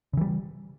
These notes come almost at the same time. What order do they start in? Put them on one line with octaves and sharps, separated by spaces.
C#3 E3 G3